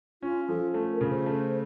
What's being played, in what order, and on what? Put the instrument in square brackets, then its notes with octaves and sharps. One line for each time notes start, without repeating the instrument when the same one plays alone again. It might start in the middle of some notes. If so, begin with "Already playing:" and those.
[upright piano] C#4 [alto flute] F4
[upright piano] F3 [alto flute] A4
[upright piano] A3
[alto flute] A#4
[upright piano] C#3
[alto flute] C5
[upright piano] A3